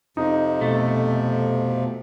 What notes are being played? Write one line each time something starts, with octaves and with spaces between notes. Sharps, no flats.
F2 C3 F3 D#4
B2 A3